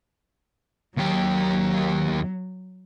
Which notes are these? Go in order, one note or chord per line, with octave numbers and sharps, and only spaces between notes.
D#2 F#3 G4